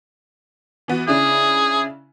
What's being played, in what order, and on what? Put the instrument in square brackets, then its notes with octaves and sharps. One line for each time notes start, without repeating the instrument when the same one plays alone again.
[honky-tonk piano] E3 B3 F#4
[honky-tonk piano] C#3 D4 E4 [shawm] G#4